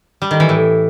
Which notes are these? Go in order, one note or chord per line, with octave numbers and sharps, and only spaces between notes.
G3
D#3
E3
A2